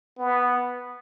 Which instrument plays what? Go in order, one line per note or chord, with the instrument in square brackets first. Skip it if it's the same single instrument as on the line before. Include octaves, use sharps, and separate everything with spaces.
[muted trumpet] B3